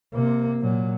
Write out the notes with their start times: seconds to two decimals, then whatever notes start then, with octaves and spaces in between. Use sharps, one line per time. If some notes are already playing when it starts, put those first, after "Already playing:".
0.14 C3 A#3
0.61 A#2 F#3